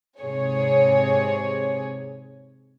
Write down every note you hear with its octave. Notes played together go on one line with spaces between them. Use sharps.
G#2 C3 G#4 C#5